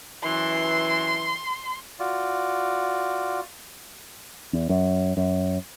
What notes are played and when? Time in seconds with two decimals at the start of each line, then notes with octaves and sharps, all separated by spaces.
0.24 F#2 E3 C6
2.00 F4 F#4 D5
4.53 E2
4.69 F#2
5.17 F#2